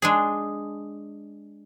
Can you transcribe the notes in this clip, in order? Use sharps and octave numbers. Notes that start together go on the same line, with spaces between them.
G#3 D4 G#4